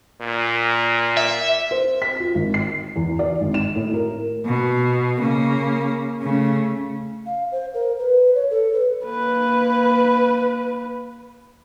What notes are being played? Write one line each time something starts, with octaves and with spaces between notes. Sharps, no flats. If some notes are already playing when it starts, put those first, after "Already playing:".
A#2
E5
C5
B6
F4
G#1
C7
E2
D5
G#1
E7
A2
A#4
B2
C#3 A#3
C#3 A3
F5
C5
A#4
B4
C#5
A4
B4
A#3 B4